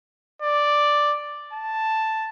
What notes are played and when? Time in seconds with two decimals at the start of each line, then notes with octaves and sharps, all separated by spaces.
0.42 D5
1.53 A5